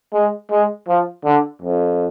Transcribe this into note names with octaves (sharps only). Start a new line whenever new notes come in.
G#3
G#3
F3
D3
F2